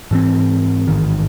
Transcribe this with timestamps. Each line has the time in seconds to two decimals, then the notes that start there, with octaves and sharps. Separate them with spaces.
0.11 G#2 E3 C4
0.88 A1 G#2 D#3